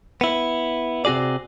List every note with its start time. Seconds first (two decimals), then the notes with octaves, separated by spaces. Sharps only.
0.21 B3 E4
1.05 C3 C4 F#4 G#4 D5